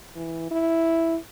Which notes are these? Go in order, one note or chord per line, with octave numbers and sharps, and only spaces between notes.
E3
E4